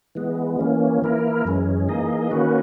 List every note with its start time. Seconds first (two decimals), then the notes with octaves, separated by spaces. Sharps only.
0.15 E3 G#3 B3
0.59 E3 A#3 C#4
1.02 E3 A#3 E4 A#4
1.45 F#2 E3 G#3 C#4
1.88 E3 A#3 D#4 G#4 D#5
2.31 D#3 A#3 C#4 F#4 B4